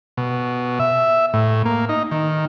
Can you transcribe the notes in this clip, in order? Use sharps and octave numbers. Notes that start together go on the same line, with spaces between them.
B2
E5
A2
A#3
D#4
D#3